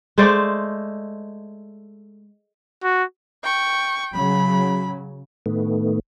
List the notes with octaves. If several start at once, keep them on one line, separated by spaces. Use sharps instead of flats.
G#3 A3 C5 D5
F#4
G5 C#6
C#3 F#3 B5
A2 D#3 A3 B3